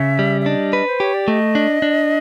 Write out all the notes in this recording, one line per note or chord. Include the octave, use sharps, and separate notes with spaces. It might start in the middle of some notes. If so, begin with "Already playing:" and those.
Already playing: C#3 E5
G3
E5
D4 D#5
B4
C5
G4 C#5
D5
A3 D#5
D4
D4